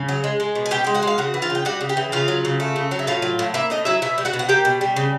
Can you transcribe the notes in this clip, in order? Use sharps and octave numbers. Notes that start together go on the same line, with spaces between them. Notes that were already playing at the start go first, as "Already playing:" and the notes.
Already playing: C#3 G#5
F#3
G#3
G#3
B2
G#5
B2 G4 G5
G#3 G5
F#4 F#5
G#3 F5
C#3 F#4 F#5
E3
F4 F5
C#3
G5
G3 F#4 F#5
C#3
G4 G5
E3
C#3 F4 F5
F#3
C#3
A3
C#3
F#3
E5
A2 F4 F5
F#3
A2
A#3 E4 E5
A2 D#4 D#5
F#3 E4 E5
B2 E4 E5
G3
F#4 F#5
B2
F#5
A#3 G4 G5
B2
G3
C#3